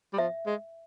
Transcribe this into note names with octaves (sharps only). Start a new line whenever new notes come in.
G3
F3 E5
G#3